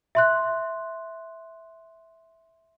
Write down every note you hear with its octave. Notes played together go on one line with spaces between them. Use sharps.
E5 C6 F#6